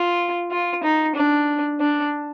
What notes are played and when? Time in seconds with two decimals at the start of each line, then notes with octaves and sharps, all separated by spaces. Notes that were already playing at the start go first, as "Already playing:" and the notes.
Already playing: F4
0.51 F4
0.83 D#4
1.15 D4
1.80 D4